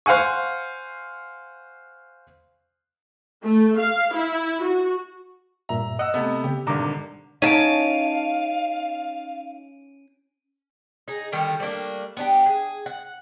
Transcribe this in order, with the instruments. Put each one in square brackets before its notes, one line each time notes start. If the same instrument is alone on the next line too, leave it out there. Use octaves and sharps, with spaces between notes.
[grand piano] C5 F5 F#5 G#5 C#6
[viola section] A3
F5
E4
F#4
[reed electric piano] G2 A#2 E5 [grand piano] A#5
[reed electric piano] D#5 [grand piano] F#5 E6
[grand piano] C3 A3 B3
[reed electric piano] C#3 B3 [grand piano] G4
[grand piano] G#1 G2 D3 [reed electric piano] B2 A#5 D6
[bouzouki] C#4 A5 [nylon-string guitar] D#4 [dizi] F5 [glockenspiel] D7 D#7
[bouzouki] D#4 G#4
D3 D#3 G3 B3
G3 A3 A#3 D4
B3 D4 G4
G#4
F#5